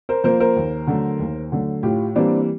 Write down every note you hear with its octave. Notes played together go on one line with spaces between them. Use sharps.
A#4 C5
F3 A#3 A#4 C5
A#4 C5
D#2
D3 F#3 A3
D#2
D3 F#3 A3
A2 F4 G4
E3 G3 A#3 C4 D4